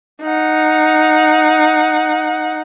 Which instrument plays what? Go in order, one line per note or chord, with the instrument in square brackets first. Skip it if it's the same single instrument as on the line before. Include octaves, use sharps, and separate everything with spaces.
[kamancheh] D#4 F#5